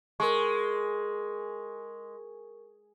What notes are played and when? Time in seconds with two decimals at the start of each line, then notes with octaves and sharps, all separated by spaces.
0.20 G#3 A#4 C#6